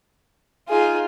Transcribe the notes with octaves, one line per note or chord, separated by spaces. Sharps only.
D#4 F4 G#4